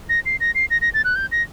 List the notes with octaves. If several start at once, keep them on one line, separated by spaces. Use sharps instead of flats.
A#6
C7
A#6
C7
A#6
A#6
A6
F#6
G6
A#6